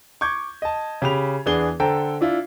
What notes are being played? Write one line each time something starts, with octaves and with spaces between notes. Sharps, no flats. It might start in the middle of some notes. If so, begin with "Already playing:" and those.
C#6 D6 G6 G#6
D#5 A5
C#3 G4 B5 F7
E2 B3 D4 G#4 G7
D3 A4 C5 G5 A#5
D4 E4 F4